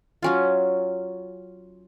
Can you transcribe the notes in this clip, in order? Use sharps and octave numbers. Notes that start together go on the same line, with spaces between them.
F#3 C#4 F4